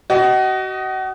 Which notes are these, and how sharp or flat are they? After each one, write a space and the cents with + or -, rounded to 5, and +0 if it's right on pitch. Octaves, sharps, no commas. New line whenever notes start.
F#4 +35 D#5 +0